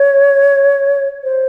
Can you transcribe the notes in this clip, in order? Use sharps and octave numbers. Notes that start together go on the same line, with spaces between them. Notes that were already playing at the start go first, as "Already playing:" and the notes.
Already playing: C#5
C5